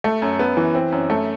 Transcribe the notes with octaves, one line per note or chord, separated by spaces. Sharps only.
A3
F#2
B3
E3
C4
F#2
A3